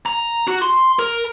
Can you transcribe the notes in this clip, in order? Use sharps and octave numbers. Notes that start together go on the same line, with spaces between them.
A#5
F#4
C6
A#4